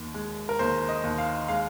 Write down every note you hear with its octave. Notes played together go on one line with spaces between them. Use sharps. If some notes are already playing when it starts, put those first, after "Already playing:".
Already playing: D#2
G#3
A#4
D#2 C5
D#5
D#2
F5
G#3 F5